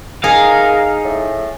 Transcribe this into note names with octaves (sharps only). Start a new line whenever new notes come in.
D#4 G#4 A#4 F5
A2